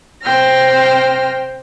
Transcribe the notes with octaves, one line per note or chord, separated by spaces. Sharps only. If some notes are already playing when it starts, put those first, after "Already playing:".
C3 C5 G5 F6 A#6